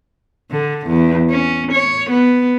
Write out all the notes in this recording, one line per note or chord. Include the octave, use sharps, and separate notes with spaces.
D3
E2
C#4
C#5
B3